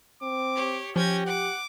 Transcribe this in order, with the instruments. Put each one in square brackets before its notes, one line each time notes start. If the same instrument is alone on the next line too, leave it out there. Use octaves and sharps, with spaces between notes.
[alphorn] C4 [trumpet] D6
[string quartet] G4 C#5
[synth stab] F3 [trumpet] C#4 [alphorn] G4 [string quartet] G5 G#6 A#6
[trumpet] F#5 [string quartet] D6